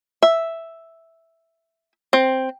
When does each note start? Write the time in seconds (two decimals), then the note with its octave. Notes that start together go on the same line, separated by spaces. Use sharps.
0.23 E5
2.13 C4